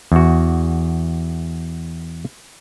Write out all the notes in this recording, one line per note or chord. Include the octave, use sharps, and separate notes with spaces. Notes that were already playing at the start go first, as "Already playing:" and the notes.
E2 F#4